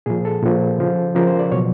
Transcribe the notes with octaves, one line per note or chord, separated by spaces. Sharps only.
A#2 F3 G#4
A4
A#2 F3
C#3 F3
C#3 F3 A#4
C5
D5
B2 F#3 C#5